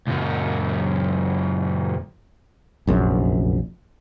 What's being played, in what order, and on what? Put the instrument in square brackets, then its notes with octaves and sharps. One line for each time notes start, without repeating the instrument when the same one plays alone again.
[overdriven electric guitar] C#2 F#2
[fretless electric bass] F1 A#1 F#2